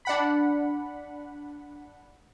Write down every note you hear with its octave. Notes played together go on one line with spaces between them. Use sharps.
D4 F#5 B5